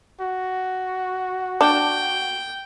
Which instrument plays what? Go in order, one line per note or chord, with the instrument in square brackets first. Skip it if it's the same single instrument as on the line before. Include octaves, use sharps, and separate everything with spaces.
[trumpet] F#4
[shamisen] D4 [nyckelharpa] G5